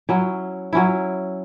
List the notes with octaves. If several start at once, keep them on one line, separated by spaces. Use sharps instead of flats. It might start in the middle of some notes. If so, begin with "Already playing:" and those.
F#3 C#4 E4
F#3 C#4 E4